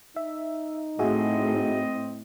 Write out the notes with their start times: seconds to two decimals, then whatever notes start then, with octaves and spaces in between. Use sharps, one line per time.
0.16 D#4 E5
0.99 A2 C4 F#4 G#4 D#5 E5